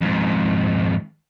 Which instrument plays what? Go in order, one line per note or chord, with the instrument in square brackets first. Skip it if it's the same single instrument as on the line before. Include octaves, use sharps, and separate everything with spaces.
[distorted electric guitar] F2 G#2